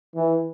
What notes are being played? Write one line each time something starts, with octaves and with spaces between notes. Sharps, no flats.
E3